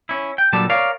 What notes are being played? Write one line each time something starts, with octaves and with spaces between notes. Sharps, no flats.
C#4 E4
G5
A#2 D3 F#3 G3 A5
A#4 C#5 D5 F5